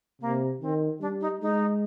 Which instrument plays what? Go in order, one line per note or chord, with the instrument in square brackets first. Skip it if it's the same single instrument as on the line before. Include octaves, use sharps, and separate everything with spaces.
[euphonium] C3 [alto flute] A#3
[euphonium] D#3 [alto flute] C4
[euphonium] G3 [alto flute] D4
[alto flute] D#4
[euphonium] G#3 [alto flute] D#4